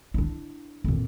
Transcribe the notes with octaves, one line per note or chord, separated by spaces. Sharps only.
D4 E4
F2 A#2